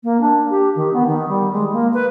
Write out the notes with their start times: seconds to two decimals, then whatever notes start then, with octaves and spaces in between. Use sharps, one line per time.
0.04 A#3
0.21 D4
0.50 G4
0.76 D#3
0.93 B3
1.07 D#3
1.28 G3
1.52 G#3
1.72 A#3
1.93 B4